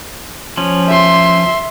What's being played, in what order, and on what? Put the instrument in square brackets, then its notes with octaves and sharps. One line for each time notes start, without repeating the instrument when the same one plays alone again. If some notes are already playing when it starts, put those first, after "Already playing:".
[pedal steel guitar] F3 C#4
[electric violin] E5 C6